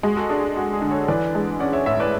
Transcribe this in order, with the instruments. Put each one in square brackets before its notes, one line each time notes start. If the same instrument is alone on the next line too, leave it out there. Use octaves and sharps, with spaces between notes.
[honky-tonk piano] G#3 [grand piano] F#4
[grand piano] F#4 A4
[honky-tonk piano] D4 [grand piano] G#4
[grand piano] F#4
[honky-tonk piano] F#4 [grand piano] G#4
[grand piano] G#4
[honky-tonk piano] D3
[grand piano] A4 C#5
[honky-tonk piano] E3 [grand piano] B4 D5
[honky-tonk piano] G#3
[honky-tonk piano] C#4 [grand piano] D5 F#5
[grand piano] C#5 E5
[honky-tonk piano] A2 [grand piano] C#5 E5
[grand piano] B4 D5